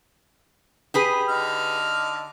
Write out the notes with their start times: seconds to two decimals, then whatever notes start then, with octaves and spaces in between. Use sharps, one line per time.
0.94 G4 G#4 B4
1.29 D3 D#4 F6